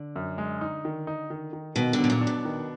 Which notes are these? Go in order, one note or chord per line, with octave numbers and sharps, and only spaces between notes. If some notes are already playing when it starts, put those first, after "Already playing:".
Already playing: D3
F#2
G#3
D#4
D#3
D#4
D#3
D#3
B2 D#3
D3 F#3
B2
A#2
D4
B2
D#3